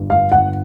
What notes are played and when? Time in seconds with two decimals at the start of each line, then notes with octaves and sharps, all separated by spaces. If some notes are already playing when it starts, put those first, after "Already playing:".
Already playing: G1 G2
0.10 F5
0.32 G1 F#5